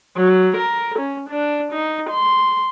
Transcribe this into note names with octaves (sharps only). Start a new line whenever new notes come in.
F#3
A#4
C#4
D4
D#4
C6